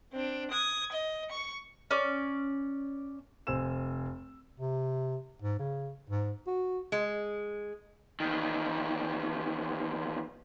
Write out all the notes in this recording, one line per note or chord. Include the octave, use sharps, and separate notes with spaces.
C4 D4
D#6 G#6
D#5
C#6 C#7
C#4 D5
F1 C5 G#5 E6 E7
C3
G#2
C#3
G#2
F#4
G#3
E2 D#3